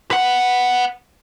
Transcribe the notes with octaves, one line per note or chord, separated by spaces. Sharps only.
B4 F#5